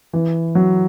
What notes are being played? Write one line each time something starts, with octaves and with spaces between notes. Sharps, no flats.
E3
F#3